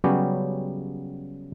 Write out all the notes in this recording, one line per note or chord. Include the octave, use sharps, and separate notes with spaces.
C#3 F#3 G3 B3 C#4 G4